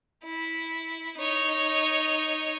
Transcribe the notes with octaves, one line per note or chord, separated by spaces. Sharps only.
E4
D#4 C#5